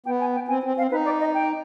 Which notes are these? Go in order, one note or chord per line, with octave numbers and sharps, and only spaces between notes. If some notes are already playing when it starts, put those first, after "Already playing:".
B3 G5
G#5
G5
C4 G#5
C4
C4 F5
D#4 B4
D5
D#5
G5